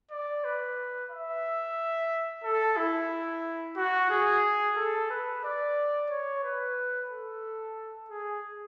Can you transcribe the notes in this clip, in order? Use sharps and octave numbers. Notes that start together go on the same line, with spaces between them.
D5
B4
E5
A4
E4
F#4
G#4
A4
B4
D5
C#5
B4
A4
G#4